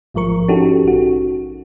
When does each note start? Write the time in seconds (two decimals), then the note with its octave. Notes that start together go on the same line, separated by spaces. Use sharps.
0.14 A1 G#2 F3 A#4 C#6
0.48 C#4 D#4 F#4 G4 A4
0.84 A#1 F#4